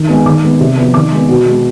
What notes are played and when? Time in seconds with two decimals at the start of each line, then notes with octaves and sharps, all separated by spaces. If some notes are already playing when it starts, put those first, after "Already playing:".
Already playing: D#3
0.09 G#3 B3
0.26 D#3 D6
0.43 G#3 B3
0.60 C3
0.78 F3 B3
0.94 D#3 D6
1.12 G#3 B3
1.29 B2
1.46 G#3 B3